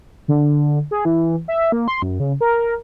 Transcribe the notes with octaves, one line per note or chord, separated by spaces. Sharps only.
D3
G#4
E3
E5
A#3
C6
F#2
C#3
A#4